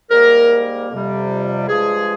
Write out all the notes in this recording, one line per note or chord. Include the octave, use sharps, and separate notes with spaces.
G#2 G3 A#3 A#4
F2 C3 G3
G2 F3 G#3 G#4